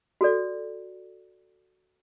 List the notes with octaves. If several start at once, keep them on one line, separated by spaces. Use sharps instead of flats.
F#4 A4 D5